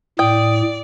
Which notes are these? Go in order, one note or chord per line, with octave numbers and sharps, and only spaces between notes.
A2 D5 G5 D#6